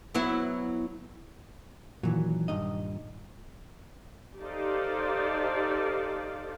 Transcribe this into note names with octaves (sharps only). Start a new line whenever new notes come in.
F#3 B3 E4
A#2 D#3 E3 F#3
G2 D#4 D#5
D#4 G4 A4 C5 D5 F5